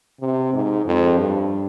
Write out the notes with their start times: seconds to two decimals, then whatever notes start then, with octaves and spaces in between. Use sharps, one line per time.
0.21 C3
0.54 G#2
0.86 F2
1.18 G2